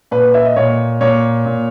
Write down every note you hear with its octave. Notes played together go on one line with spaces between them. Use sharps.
A#2 B4
E5
D#5
A#2 C#5
A#2 C#5
A#2